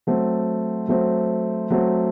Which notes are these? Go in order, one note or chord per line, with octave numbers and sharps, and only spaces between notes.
F#3 A3 C4
F#3 A3 C4
F#3 A3 C4